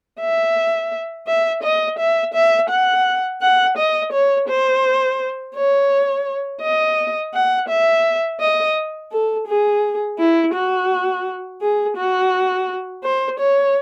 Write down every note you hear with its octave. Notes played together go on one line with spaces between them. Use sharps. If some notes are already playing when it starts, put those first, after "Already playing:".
E5
E5
D#5
E5
E5
F#5
F#5
D#5
C#5
C5
C#5
D#5
F#5
E5
D#5
A4
G#4
E4
F#4
G#4
F#4
C5
C#5